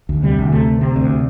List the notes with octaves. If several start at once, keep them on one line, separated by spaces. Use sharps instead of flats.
D2
C3 G3
D2
C3 A3
D2
C3 C4
D2
C3